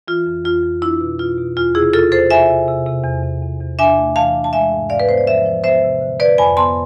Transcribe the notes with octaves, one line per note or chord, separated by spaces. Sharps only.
E3 F4
F2
F2 F4
F2
D4 E4
B2
B2 F4
B2
E2 F4
C3 E4 G#4
E2 F4 A4
E2 A4 C5
C3 E5 G#5
C3
C3
C3
E2
E2
E2
E2
D4 E5 G#5
A3
E3 F5 A5
D4
A5
G#3 E5 G#5
G#2
G#2 D5 F5
B4
B3 C5
D5
F3 C5 E5
F3
B3 C5 E5
C3
D3
D3 B4 D5
F2 G#5 B5
B3 A5 C6